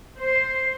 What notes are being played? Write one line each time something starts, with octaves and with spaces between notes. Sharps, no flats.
C5